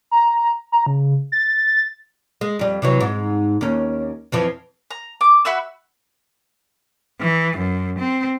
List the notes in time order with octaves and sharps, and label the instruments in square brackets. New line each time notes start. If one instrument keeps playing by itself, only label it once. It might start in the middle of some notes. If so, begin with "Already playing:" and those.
[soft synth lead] A#5
A#5
C#3
A6
[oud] G#3
F2 G3
C3 E3 F#3
G#2
D#2 C#4
F2 E3 F3
[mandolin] A#5
D6
F#4 E5 B5 E6
[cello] E3
F#2
C4